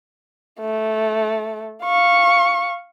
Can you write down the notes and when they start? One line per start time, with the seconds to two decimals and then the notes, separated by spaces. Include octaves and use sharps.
0.60 A3
1.83 F5 C#6